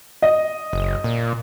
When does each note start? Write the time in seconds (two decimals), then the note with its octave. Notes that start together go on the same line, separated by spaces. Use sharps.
0.22 D#5
0.73 F#1
1.04 A#2